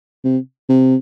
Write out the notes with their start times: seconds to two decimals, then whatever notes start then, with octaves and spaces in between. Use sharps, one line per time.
0.25 C3
0.69 C3